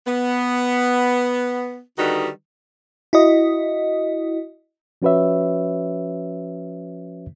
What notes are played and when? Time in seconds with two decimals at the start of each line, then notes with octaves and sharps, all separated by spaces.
0.07 B3
1.98 D3 D#3 G3 D#4 F#4 B4
3.13 E4 F#4 D#5
5.02 F3 C#4 F#4 B4 C#5 E5